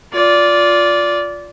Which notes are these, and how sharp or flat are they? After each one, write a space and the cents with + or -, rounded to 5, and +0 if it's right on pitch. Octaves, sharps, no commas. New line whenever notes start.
F4 +10 D5 -15